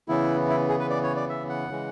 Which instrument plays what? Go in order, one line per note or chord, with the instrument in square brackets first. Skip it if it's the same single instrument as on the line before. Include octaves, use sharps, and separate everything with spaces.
[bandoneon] C#3 E3 B3 E4
E4
G#4
B4
D5
C#5
D5
E5
F#5
C#3 E3 G#3